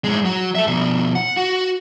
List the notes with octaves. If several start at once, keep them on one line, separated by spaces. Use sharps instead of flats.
A2 G#3
F#3
A4 E5
B2 F3
F#5
F#4